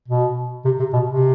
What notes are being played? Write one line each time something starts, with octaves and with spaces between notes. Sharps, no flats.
B2
C3
C3
B2
C3